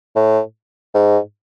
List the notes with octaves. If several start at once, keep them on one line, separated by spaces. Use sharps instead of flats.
A2
G#2